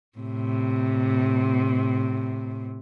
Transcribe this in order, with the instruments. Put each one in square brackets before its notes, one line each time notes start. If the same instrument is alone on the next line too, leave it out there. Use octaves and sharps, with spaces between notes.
[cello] A2 C3